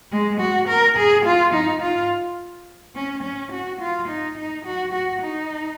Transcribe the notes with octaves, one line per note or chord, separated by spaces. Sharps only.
G#3
F#4
A#4
G#4
F4
D#4
F4
C#4
C#4
F#4
F4
D#4
D#4
F#4
F#4
D#4